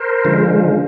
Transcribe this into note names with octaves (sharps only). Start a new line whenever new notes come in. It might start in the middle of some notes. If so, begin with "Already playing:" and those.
Already playing: A#4 C5
D3 F3 G#3